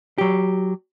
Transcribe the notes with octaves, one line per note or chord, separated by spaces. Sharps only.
F#3 G4